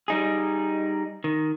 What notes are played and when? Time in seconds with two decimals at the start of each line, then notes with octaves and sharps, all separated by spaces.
0.08 G3 D#4 G#4
1.24 D#3